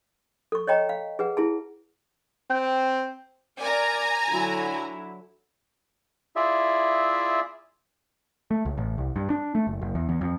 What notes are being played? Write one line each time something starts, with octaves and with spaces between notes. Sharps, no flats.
A4 C#6
C#5 D#5 G5 A#5
F5
G#4 B4 F#5
E4 G#4 A5
C4 G5
A#4 D5 G#5 A#5
D3 F#3 E4
E4 F4 G#4 D5 E5
A3
C#2
A1
C2
G2
D4
A3
F#1
F#1
E2
E2
F2